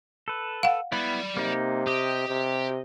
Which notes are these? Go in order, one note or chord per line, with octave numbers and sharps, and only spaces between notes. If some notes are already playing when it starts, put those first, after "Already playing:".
A4 B4
F5 F#5
B3 E4 D5 B5
C3 A#3 D#4
G4 D#5
C3